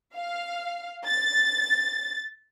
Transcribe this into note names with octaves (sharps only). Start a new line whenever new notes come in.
F5
A6